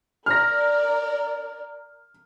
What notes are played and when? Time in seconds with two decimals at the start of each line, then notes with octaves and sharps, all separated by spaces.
0.26 A#4 D5 F6 A#6